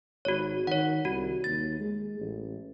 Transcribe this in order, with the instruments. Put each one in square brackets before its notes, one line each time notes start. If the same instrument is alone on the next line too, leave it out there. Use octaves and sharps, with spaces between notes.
[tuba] G#1 [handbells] F#4 C#5
[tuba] D#3 [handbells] C#5 F#5
[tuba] C2 [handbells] F#4
[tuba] D#2 [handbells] A6
[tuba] G#3
A1